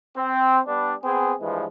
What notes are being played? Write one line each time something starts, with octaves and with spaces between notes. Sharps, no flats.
C4
G3 B3 D4
B3 C4 G#4
G2 E3 F3 G#3